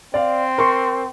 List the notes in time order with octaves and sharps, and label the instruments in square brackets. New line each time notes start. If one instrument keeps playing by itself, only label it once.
[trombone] C4 [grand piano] D5 F5
[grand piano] A#4 C6 C#6